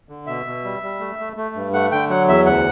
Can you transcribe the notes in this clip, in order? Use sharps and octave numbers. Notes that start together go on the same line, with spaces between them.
D3
B2 E5
B2
G3
G3
A3
A3
A3
G2
A3 F#5
D3 G5
F#3 F#5
E2 E5
D2 F#5